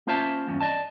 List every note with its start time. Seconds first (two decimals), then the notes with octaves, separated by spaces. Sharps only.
0.07 A#3 C#4 F4 C5 E5 A5
0.48 E2 G2 C#4
0.61 D5 D#5 A5